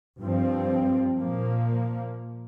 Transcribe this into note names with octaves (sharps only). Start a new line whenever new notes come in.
G2 F3 C4
A#2 F3 A#3